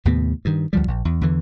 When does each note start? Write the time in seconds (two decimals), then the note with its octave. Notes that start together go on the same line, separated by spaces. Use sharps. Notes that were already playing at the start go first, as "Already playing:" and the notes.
0.05 D#2 A2 C3 B3
0.45 G2 D#3
0.73 D2 F3 G3
0.87 A#1
1.05 E2
1.21 E2 D3 E3